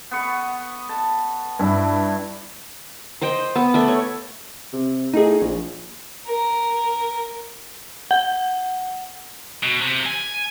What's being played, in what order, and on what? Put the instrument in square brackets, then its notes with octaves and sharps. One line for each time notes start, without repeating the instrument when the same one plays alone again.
[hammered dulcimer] B3 C#6
A5
[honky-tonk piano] G2 [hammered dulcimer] E4
[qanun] C5 D#5 G5
B3
A3 D5 E5
C#5
[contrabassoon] C3
[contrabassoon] A2 [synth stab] D#4 G#4
[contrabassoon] A#1
[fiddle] A#4
[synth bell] F#5
[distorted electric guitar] B2
C3
G#5